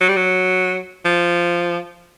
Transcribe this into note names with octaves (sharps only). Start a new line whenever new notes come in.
F#3
G3
F#3
F3